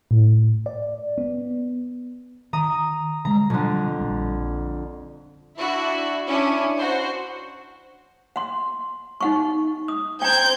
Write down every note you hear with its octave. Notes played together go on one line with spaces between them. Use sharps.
A2
D5
B3
D#3 A#5 D#6
D3 G3 G#3 A#5
F2 B2 D3 F#3 G3
A#1 G3 A#3
D4 E4 F#4
C#4 D4 E4
F#4 C5
F#5 C6
D#4 F#5 C#6
D#6
C4 G5 A#5 G6 G#6